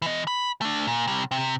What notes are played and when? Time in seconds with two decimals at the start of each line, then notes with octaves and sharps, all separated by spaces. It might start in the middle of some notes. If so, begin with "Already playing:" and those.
0.02 E3 D#5
0.27 B5
0.61 A3 D4
0.87 A#2
1.07 C3 G3
1.31 C3